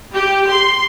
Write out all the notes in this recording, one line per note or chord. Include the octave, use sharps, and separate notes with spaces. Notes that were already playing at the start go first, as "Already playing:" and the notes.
G4
C6